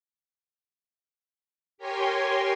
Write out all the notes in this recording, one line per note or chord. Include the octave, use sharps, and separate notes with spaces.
G4 A#4 C#5 G5 G#5 C6